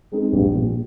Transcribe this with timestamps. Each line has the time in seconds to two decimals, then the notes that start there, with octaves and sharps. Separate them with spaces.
0.12 G#3 C4 D#4 G#4
0.32 A#1 G2
0.53 A#2 F3